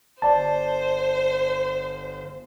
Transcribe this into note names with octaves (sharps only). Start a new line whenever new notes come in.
G1 C5 D5 A5